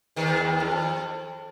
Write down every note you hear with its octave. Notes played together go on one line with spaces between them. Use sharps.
D#2 D#3
F2